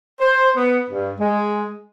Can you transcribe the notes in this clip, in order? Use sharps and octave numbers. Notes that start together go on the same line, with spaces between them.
C5
B3
G2
G#3